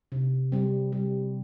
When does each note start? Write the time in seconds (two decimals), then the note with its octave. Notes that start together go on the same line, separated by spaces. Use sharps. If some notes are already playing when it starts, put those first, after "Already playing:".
0.12 C3
0.52 G3 C4
0.92 G3